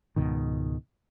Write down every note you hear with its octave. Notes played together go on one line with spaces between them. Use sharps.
C#2 G#2 B2 D#3